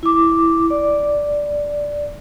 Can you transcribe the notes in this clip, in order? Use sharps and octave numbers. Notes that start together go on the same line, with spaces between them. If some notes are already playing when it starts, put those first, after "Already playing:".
E4 D6
D5